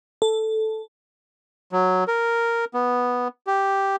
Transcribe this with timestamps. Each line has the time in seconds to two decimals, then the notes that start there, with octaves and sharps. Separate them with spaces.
0.22 A4
1.72 F#3
2.08 A#4
2.74 B3
3.47 G4